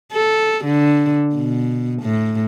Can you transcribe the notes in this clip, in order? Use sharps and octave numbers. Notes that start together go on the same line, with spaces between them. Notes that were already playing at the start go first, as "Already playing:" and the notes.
A4
D3
B2
A2